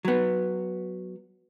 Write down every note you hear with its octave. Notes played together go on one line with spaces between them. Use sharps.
F#3 B3